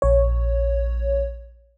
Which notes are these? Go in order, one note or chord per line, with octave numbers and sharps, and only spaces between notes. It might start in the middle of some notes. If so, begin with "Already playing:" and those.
A#1 C#5